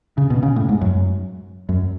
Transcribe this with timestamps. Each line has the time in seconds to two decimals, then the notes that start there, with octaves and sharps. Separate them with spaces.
0.18 C#3
0.30 B2
0.43 C#3
0.56 A2
0.69 G#2
0.81 F#2
1.69 F#2